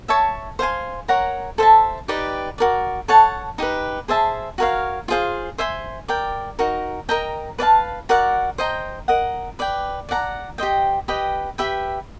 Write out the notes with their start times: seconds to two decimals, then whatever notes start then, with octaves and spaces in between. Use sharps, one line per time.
0.08 C#5 E5 A5 C#6
0.59 C5 F5 G#5 C6
1.08 A#4 C#5 F#5 A#5
1.58 A4 C5 E5 A5
2.08 D#4 G4 B4 D5
2.58 F#4 A#4 D5
3.08 A4 C#5 F#5 A5
3.58 D#4 G4 B4
4.08 G#4 C5 E5 A5
4.58 F#4 A#4 C#5 F5
5.08 F4 G#4 C5 F5
5.58 C5 E5 G#5 C6
6.08 A#4 D5 G5
6.59 D#4 F#4 A#4
7.09 A#4 D#5 G5 A#5
7.58 B4 D5 F5 A5
8.09 F#4 A#4 D5 F#5
8.58 C5 D#5 G5 A#5
9.08 A#4 D#5 F#5
9.59 B4 D5 G5
10.09 D5 F#5 A#5
10.58 G4 C5 D#5 G5
11.08 G4 B4 D#5 G5
11.58 G4 B4 E5 G5